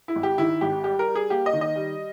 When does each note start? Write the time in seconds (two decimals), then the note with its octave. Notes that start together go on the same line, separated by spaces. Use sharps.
0.08 E4
0.15 G#1
0.23 G4
0.38 D#3 E4
0.61 G#1 G4
0.84 G3 G4
0.99 A#4
1.08 G3
1.15 G#4
1.30 A#3 G4
1.46 D#5
1.53 D#3
1.61 D#5
1.76 G3